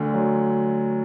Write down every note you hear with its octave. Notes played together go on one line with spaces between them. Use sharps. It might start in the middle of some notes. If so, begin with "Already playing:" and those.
Already playing: D2 D3
F#3